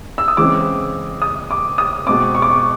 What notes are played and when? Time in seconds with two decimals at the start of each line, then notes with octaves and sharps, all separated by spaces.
0.18 E6
0.28 D#6
0.37 C#3 E3 G#3 C4 D6
1.22 D#6
1.51 D6
1.78 D#6
2.07 B2 G#3 C4 D6
2.35 C#6
2.42 D6
2.50 C#6